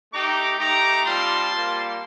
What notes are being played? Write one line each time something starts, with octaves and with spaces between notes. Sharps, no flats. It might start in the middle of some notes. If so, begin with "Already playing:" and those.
A3 D#4 G4 A#5 D6
A3 D#4 G4 A#5 D6
G3 C4 F4 A5 C6
G3 A#3 F4